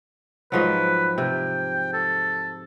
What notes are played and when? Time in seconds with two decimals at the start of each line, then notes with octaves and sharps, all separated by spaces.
0.52 G#2 F3 F#3 B4
1.18 C3 G5
1.93 A4